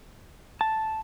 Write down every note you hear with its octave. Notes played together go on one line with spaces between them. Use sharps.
A5